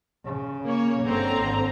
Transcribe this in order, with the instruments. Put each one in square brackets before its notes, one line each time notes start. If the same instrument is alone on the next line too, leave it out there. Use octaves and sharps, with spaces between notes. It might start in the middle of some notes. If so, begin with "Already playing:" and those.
[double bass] C#3
[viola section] A#3 C#5
[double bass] G1 [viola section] D3 C4 A#5
[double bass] G#1